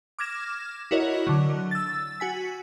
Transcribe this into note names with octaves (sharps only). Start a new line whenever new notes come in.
D6 F6 G#6 A#6 E7
E4 F#4 A#4 C#5 D#5
D3 F#3
E6 A6
F#4 G#5 B6